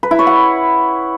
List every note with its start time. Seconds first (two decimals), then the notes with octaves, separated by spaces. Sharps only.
0.03 B4
0.11 E4
0.19 C#5
0.27 F#5